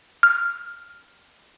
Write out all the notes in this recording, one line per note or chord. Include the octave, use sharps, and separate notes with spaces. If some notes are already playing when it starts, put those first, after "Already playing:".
F6